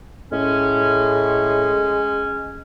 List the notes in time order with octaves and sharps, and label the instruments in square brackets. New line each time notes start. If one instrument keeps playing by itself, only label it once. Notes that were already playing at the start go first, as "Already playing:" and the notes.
[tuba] A2 [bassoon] G#3 [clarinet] C#4